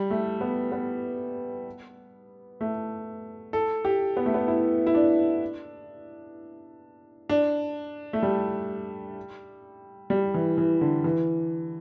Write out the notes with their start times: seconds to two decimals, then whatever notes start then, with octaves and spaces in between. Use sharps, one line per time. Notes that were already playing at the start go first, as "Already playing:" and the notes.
Already playing: G3
0.10 A3
0.41 B3
0.72 B3
2.61 A3
3.53 A4
3.85 G4
4.17 B3
4.26 A3
4.34 B3
4.48 E4
4.87 E4
4.94 D4
7.29 D4
8.13 A3
8.23 G3
10.10 G3
10.34 E3
10.58 E3
10.81 D3
11.04 E3